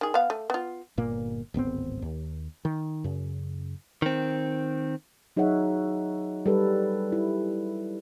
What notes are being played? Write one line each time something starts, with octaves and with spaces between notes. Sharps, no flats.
D#3 G#4
B3 F5
A3
B3 F4
G1 A#2 A#3
D1 G#1 B3 C4
D#2
D#3
F#2 C#3
D#3 C4
F#3 D#4 G#4 C#5 E5 F#5
G3 A4 B4
E4